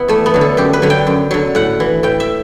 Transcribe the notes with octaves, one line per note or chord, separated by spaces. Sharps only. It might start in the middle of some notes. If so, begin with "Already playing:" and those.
Already playing: B3 E4
E2 A3
B3
D3 F#3
A4
F#2 G4
B4
D3 F#3
G5
F#2
D3 F#3
A2 F#5
E3
A2 G5
E5